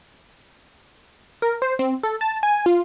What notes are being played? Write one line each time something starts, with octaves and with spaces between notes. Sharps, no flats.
A#4
C5
C4
A4
A5
G#5
F4